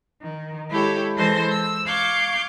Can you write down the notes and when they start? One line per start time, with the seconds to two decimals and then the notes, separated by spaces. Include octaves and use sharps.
0.22 D#3
0.70 G#3 E4 G4 A4 C#5
1.16 E3 G#3 A4 C5 C6 A#6
1.50 E6
1.86 F5 C#6 D6 G6 G#6